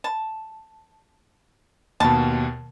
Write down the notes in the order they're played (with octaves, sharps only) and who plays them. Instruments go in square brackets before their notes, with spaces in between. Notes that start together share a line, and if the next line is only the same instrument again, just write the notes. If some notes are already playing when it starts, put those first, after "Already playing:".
[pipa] A5
[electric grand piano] D#2 B2 [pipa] A5